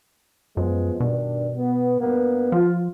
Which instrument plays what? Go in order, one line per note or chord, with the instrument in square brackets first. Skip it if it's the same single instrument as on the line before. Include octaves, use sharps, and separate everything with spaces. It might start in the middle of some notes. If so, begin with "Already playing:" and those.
[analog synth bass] F#2 [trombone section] F3 G#3 B3
[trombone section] G2 D#3 D4 [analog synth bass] B2
[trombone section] B3
G2 A#3 B3
[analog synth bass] F3 [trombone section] F4